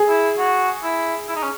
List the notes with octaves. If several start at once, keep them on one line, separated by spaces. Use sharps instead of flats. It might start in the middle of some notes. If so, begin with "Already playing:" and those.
Already playing: G#4
E4
F#4
E4
E4
D#4
C#4